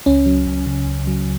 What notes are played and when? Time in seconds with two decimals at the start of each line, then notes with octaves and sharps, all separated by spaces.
0.06 C#2 C#4
0.26 F#3
0.46 C#2
0.66 C#3
0.87 C#2
1.07 F#3